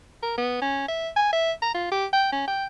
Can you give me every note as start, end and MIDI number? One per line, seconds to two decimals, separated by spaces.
0.23 0.38 70
0.38 0.61 59
0.62 0.86 61
0.88 1.09 76
1.17 1.31 80
1.33 1.52 76
1.62 1.71 82
1.74 1.89 65
1.92 2.06 67
2.13 2.30 79
2.32 2.47 61
2.47 2.66 79